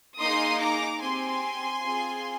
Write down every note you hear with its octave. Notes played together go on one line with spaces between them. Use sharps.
A#3 D#4 G#4 C6 D#6
A#5 D6
C4 G4 G#5 C6
C4 F4 G#4